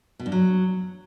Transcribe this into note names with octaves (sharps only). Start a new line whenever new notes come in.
B2
G2
F#3